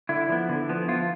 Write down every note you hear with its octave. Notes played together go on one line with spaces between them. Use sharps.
D3 E4
F3 B3
D3
F3 B3
F3 F4